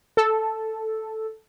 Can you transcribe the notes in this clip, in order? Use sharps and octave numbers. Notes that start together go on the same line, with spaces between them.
A4